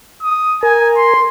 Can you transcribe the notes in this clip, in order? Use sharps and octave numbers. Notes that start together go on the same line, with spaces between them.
D#6
A#4 G#5
C6